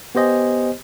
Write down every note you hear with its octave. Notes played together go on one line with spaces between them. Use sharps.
B3 G4 C5 D#5 G#5